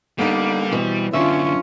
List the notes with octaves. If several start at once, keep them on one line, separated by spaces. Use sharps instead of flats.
D3 G3 A#3 B3 D#4
B2 E3 C4
F#2 D3 C#4 D4 F4 E5